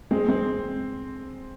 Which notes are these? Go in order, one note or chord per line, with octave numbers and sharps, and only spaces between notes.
G#3 C4
G#3 C4